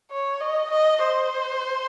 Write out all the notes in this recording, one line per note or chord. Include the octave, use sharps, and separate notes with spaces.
C#5
D#5
D#5
C5